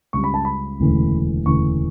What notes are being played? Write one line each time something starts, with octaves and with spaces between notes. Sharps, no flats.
C#2 C#3 G3 C#4 C#6
B5
A5
B5
E1 D2 C#3 E3 A3
E1 D2 C#3 E3 A3 C#6